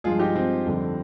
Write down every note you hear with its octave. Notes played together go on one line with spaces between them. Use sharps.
G2 F3 G#3 F4 G#4
D#4 G4
C4 D#4
F2 D3 G3